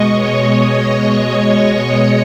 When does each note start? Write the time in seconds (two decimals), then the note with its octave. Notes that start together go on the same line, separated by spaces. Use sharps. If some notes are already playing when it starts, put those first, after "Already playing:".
Already playing: B2 G#3 D#5 C#6
0.12 C#5
1.59 D#5